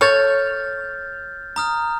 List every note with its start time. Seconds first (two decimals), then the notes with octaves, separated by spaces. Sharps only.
0.01 A4 C#5 F6 G6 A6
1.56 A#5 D#6 F6